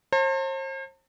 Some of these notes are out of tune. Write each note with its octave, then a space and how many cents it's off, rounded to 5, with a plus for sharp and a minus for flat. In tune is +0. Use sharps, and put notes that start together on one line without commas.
C5 +40 A5 +45